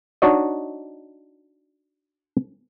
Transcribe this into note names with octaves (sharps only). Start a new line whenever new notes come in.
D4 D#4 F#4 C#5 D#5